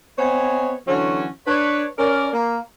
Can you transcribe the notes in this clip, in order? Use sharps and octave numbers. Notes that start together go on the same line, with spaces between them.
B3 C4 C5 C#5 D#5 G#5
D3 E3 F#3 C#4 F#4 C#5
D4 B4 C#5
C#4 A#4 D5
A#3